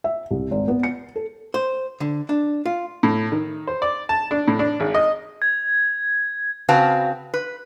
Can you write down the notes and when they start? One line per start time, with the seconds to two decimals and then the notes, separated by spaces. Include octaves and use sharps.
0.04 E5
0.31 C2
0.51 G#1
0.68 B3
0.83 C#7
1.16 A4
1.54 C5
2.00 D3
2.29 D4
2.66 F4
3.03 A2
3.32 D#3
3.67 C5
3.82 D5
4.09 A5
4.31 D4
4.48 A2
4.59 D4
4.80 G#1
4.94 D#5
5.42 G#6
6.68 C#3 C4 F#4 B4 F5 A5
7.34 B4